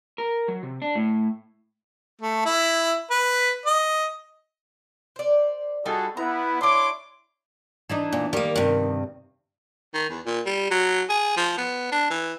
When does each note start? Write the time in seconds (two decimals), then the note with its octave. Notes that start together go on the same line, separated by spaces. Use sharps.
0.18 A#4
0.48 F#3
0.63 C3
0.82 D4
0.95 A2
2.21 A3
2.45 E4
3.10 B4
3.65 D#5
5.16 C5 D5
5.86 G3 D#4 F4 F#4 G#4 A4
6.17 B3 E4 A#5
6.61 D4 E4 C#5 C6 D6
7.89 E3 D4 D#4
8.13 A#2
8.33 D#3 G3 A#3
8.56 G2 C3
9.94 D#3
10.10 E2
10.26 A#2
10.46 G3
10.71 F#3
11.10 G#4
11.37 F3
11.58 B3
11.92 D4
12.10 E3